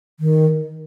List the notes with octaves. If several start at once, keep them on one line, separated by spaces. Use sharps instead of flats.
D#3